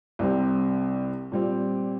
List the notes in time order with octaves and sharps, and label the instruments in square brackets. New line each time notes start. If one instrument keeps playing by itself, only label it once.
[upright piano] C2 C3 G3 C4
A#2 G3 C4